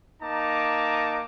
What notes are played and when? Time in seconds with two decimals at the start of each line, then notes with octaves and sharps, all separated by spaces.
0.23 A#3 D#4 A5 A#5 D6